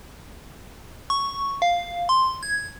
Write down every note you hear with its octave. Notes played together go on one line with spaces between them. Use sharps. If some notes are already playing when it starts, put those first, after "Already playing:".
C#6
F5
C6
G#6